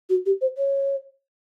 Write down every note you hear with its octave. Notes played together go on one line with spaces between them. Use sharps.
F#4
G4
C5
C#5